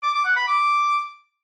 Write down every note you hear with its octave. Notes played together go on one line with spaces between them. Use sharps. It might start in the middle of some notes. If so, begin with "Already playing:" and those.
D6
D6
F#5
B5
D6